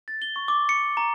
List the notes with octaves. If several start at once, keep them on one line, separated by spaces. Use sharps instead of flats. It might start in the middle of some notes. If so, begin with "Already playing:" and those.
A6
G7
C#6
D6
C#7
A#5